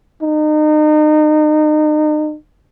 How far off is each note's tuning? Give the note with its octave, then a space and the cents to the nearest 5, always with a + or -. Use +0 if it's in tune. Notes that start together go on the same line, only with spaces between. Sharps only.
D#4 -35